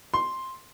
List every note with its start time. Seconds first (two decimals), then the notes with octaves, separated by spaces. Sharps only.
0.14 C6